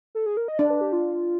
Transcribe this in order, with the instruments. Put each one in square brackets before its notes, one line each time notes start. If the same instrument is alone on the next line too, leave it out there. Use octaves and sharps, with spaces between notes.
[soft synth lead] A4
G#4
A#4
D#5
[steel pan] D4 [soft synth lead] D5
[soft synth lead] B4
G4
F4